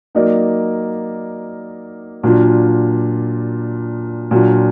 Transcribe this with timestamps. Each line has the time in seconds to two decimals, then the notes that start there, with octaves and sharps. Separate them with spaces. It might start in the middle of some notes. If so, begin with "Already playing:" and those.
0.15 F#3 A#3 D#4 A#4 D5
2.23 A#2 F#3 D4 F4
4.31 A#2 F#3 D4 F4